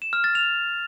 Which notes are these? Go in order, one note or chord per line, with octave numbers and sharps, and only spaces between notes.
E7
F6
A6
F7